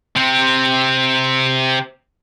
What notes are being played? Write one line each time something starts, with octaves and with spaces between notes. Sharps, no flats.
C3 C4